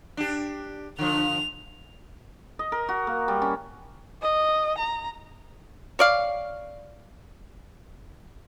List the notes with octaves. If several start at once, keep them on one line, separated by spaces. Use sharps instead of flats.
D4 G4
D3 F3 F7
D#5
A#4
F#4
A#3
G3
C#4
D#5
A#5
C#5 D5 F5